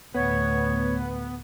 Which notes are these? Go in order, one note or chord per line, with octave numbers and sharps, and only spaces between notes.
D2 A2 B3 C#5